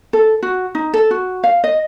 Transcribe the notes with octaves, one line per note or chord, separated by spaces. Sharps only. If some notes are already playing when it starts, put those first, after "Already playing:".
A4
F#4
D#4
A4
F#4
F5
D#5